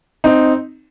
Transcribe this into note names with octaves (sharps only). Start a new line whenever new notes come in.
C4 D#4